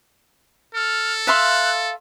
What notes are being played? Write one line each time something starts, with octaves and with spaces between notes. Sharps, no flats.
A4 F6
E5 F5 C6 F#6